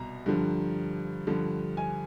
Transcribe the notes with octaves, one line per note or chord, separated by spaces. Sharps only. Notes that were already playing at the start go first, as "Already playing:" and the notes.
Already playing: C2 B2 A#5
G2 D3 F3
G2 D3 F3
G#5